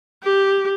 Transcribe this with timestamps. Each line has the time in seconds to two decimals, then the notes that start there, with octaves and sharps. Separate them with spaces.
0.24 G4